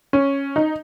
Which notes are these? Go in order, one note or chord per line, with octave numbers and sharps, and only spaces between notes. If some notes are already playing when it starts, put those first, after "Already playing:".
C#4
D#4